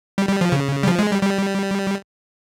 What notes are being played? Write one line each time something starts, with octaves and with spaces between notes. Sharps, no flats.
G3
G3
F3
C#3
G3
F3
G#3
G3
G3